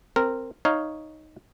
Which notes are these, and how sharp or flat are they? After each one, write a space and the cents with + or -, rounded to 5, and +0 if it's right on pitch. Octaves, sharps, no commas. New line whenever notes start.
C4 +0 A#4 -15
D#4 +0 C#5 +0 F5 +0